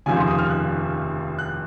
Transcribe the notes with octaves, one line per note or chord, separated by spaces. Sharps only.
F1 D#2 C#3 F3 G#5
C6
D#6
F6
F#6
F#6